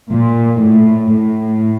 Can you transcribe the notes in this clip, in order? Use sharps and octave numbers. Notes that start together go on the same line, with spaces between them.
A#2
A2
A2